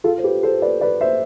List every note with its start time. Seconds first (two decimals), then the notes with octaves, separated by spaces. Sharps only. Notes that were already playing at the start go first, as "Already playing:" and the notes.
0.04 F4 A4
0.18 C5
0.24 G4 B4
0.43 A4 C5
0.62 B4 D5
0.81 B4 D5
1.01 C5 E5